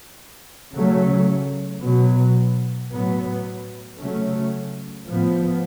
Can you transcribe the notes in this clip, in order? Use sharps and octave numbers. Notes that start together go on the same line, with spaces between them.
C#3 F#3 A3 C#4
B2 F#3 B3
A2 F#3 B3
C#3 F#3 A3 C#4
A2 F3 B3